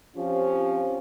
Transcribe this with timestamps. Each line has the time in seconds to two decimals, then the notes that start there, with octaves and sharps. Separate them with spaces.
0.16 F3 C4 C#4 F4 G4